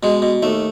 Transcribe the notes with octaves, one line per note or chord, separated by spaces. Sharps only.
B2 G#3
B2
D#2 A3